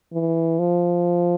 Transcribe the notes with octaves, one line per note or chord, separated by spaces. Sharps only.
E3
F3